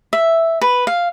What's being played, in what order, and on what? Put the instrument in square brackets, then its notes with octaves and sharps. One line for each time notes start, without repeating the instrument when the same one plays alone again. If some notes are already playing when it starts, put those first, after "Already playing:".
[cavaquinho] E5
B4
F5